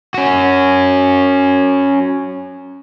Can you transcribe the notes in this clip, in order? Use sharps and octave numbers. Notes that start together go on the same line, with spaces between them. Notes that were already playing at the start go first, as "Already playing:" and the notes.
C#4 F#4